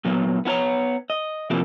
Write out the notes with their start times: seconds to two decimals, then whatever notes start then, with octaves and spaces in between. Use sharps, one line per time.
0.05 A#2 F#3 B3
0.45 B3 E4 A#4 C#5 A#5
1.10 D#5
1.50 C3 F3 A#3 E4 G4